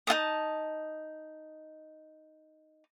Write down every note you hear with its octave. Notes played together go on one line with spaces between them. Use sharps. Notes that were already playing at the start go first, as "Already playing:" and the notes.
D#4 F4 A5 D#6